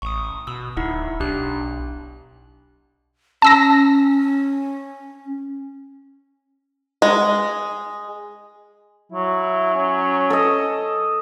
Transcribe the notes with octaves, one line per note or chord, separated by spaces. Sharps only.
A1 C#6 D#6
B2 E6
D1 D#4 E4 F#5
B1 D4 G4 F#6
C#4 A5 E6 A#6
G#3
F#3 E4
C#4
A4 D#5